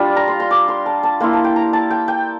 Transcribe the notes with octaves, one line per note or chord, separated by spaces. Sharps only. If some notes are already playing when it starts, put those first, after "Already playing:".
Already playing: G3 D4 F4
A#5
C6
C6
D6
C6
A5
A5
A#3 E4 C6
A5
G5
A#5
A5
G5
G5